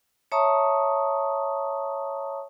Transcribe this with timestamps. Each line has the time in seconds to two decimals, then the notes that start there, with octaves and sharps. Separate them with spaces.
0.32 C#5 E5 A5 A#5 C#6 D#6